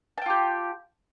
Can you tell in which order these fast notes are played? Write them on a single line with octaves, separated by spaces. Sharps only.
A5 G5 F4 G4